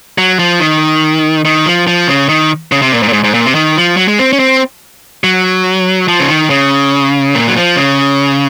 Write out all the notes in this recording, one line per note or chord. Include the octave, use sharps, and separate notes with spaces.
F#3
F3
D#3
D#3
F3
F3
C#3
D#3
C#3
C3
A#2
G#2
A#2
G#2
G#2
A#2
C3
D#3
F3
F#3
G#3
C4
C#4
C4
F#3
F3
C#3
D#3
C#3
A#2
F#3
F3
C#3